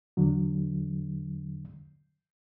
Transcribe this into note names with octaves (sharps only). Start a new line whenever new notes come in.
E2 D3 F#3